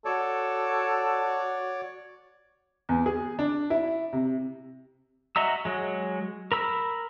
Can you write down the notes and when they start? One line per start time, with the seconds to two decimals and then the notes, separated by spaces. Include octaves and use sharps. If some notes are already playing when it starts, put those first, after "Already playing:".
0.05 F#4 A4 C#5 D5
2.89 E2
3.06 G#4
3.39 D4
3.70 E4
4.13 C3
5.36 F#4 D#5 E5 A#5 E6
5.65 F#3 G#3
6.52 A#4 B5 E6